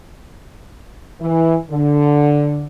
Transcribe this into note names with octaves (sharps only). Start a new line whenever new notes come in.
E3
D3